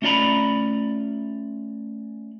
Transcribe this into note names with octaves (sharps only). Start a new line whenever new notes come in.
A3 C#4 F4 D5 A#5 B5